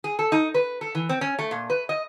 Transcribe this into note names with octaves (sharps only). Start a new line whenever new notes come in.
G#4
A4
D#4
B4
A4
E3
C4
C#4
A3
A#2
B4
D#5